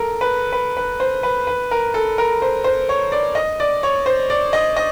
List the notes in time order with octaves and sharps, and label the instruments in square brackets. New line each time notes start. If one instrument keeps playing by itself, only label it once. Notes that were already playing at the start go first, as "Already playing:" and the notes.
Already playing: [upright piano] A4 A#4
B4
B4
B4
C5
B4
B4
A#4
A4
A#4
C5
C5
C#5
D5
D#5
D5
C#5
C5
D5
D#5
D#5